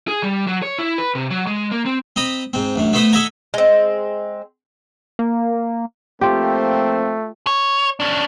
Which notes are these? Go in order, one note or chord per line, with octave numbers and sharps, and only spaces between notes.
G#4
G3
F#3
C#5
E4
B4
C3
F#3
G#3
A#3
C4
C4 D#5 A#5 B5
G#2 C4
A1 F#2 D3
A3 B3 E4 C5 B5 D#6
A4 D#5 E5 F#5 G#5 A#5
G#3 C4
A#3
F3 A3 A#3 C4 F4 G4
C#5
C#4 D4